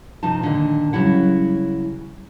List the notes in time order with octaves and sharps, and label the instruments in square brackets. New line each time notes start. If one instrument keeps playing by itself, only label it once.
[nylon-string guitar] C3 F3 D#4 F4 A5
A#2 D3 D#3
C#3 E3 F#3 G3 E4 F#5